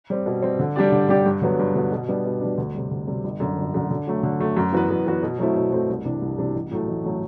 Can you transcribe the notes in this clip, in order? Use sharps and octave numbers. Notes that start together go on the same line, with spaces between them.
G3 C4
B2
G3 C4
D3
G3 D4 G4 D5
D3
G3 D4 G4 D5
G2
D3 F#3 B3
G2
D3 F#3 B3
B2
G3 B3 D4
B2
G3 B3 D4
D2
C3 G3
D2
C3 G3
G1
F#2 D3
G1
F#2 D3
D3
F#3 A3
D3
F#3 A3
F#2
E3 B3 F#4 B4
F#2
E3 B3 F#4 B4
B2
F#3 A3 C4 E4
B2
F#3 A3 C4 E4
C2
C3 E3 G3 D4
C2
C3 E3 G3 D4
A1
A2 F#3 A3
A1
A2 F#3 A3